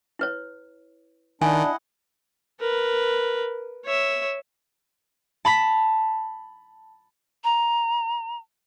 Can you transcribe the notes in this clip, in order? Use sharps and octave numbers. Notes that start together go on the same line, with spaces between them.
E4 B4 C#5
D#3 D4 E4 D#5 F#5 G#5
A#4 B4
C#5 E5
A5 B5 B6
A#5